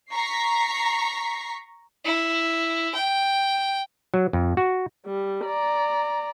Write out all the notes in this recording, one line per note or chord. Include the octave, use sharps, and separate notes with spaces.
A#5 C#6 B6 C7
E4
G5
F#3
F2
F#4
G3
D5 A#5